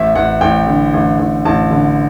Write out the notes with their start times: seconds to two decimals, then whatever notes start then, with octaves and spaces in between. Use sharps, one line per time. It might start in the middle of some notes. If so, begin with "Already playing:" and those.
Already playing: A1 E5
0.15 A1 F#5
0.41 A1 G5
0.67 D3
0.94 A1
1.19 A1
1.45 A1 A5
1.71 D3